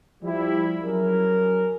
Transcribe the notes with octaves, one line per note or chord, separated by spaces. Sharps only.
F3 G3 E4
F#3 C#4 G#4 A#4